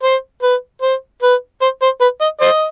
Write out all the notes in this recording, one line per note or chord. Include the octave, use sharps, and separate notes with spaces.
C5
B4
C5
B4
C5
C5
B4
D#5
C5 D#5